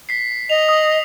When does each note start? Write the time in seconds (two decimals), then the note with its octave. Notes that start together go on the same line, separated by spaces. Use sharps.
0.09 B6 C7
0.50 D#5 F7
0.69 D#6